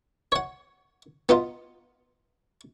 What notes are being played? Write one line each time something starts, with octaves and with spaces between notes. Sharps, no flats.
C#5 F#5
B3 D#4 F4